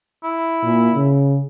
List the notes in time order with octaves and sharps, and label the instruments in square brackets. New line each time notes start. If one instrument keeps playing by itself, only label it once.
[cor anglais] E4
[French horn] A#2
C#3